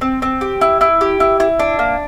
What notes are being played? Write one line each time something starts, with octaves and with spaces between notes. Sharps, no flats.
C4
C4
G4
E4
E4
G4
E4
E4
D4
A#3